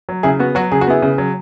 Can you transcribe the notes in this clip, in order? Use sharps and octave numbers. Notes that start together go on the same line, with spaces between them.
F#3
C#3 E4 G#4
B3 F#4
F#3 F#4
C#3 G#4
F#4
B3 E4 G#4
C#3
F#3